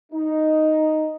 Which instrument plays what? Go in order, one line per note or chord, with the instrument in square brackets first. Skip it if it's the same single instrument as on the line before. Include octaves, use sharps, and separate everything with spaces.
[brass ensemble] D#4